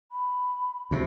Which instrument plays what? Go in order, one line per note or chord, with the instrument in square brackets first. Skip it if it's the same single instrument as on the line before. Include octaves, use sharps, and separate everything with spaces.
[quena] B5
[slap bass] D2 C3